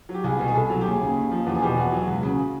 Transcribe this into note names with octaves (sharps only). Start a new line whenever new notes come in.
F#3
G4
C2 G#4
B2
G#4
C2 A4
F#3
G4
D#2 G#4
C#3
D#2
F3
E2 G4
G#4
B2 G4
E2 F#4
F#3
C#2
C#3